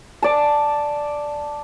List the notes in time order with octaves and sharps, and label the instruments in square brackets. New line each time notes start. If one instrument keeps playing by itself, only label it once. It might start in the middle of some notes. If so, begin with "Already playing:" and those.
[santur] D5 A5